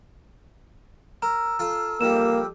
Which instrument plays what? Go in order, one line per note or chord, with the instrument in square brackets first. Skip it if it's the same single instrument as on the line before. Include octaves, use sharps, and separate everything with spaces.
[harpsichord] A#4 [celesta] A#5 [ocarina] E6
[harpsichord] F4 A4
[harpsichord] F2 F3 G3 [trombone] A#3 [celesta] E7